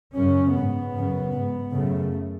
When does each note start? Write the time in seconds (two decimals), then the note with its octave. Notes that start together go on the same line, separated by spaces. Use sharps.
0.15 F#2 C#3 C#4
0.55 G#2 B3
0.94 F#2 C#3
1.33 G#2
1.72 F#2 C#3 A3